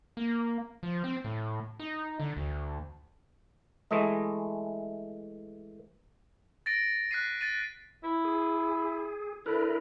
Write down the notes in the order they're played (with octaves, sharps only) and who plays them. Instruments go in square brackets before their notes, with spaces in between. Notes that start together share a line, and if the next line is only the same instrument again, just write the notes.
[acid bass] A#3
F3
C4
A2
D#4
D3
D2
[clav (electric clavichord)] E3 G#3 A3 D#5
[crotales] A6 A#6 D7
F#6 B6 C7 D#7
A6 D#7
[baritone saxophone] E4
[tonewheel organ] G#4
[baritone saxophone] D3 [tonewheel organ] E4 A#4 B4